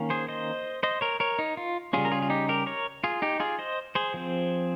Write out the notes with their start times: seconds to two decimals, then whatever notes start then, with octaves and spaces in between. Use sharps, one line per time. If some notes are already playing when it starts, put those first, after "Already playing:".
Already playing: D#3 A#3 C#4
0.10 G#4 C5
0.28 C5 D#5
0.83 C5 D#5
1.01 A#4 C#5
1.20 A#4 C#5
1.39 D#4
1.57 F4
1.93 C#3 G3 C#4 F4 G#4
2.05 A#4
2.12 F4 G#4
2.22 F4
2.30 D#4 G4
2.49 G4 A#4
2.66 A#4 C#5
3.04 F4 G#4
3.22 D#4 G4
3.40 F4 G#4
3.59 C5 D#5
3.95 G#4 C5
4.14 F3 C4